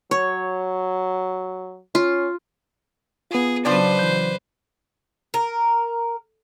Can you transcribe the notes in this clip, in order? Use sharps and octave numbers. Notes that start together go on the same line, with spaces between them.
F#3 C#5
C#4 F4
B3 F4 G#4
C#3 F3 F#3 D4 B4 C5 D5
E3 G6
A#4